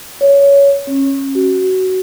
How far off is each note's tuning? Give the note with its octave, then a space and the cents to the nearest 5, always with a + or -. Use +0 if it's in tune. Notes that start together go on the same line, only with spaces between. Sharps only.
C#5 +15
C#4 -20
F#4 +20